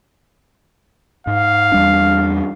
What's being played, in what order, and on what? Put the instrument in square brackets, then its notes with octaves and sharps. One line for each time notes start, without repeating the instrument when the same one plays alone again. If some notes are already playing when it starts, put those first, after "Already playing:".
[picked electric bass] G#2 [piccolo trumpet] F5
[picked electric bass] E2 G3 D4